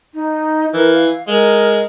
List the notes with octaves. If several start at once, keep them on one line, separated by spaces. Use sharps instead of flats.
D#4
E3 A#4
F5
G#3 A#4